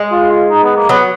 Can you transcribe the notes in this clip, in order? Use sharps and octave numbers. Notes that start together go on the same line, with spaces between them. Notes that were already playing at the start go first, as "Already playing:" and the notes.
Already playing: G#3
F4
F4
D#4
B3
A#3
F#3 B3